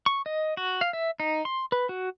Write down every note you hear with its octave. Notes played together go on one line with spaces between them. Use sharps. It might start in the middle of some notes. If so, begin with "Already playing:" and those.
C#6
D#5
F#4
F5
E5
D#4
C6
B4
F#4